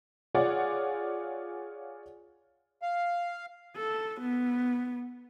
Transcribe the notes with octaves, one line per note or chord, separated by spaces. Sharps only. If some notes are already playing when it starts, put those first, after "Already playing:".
F4 G#4 C#5 D5 F#5
F5
A4
B3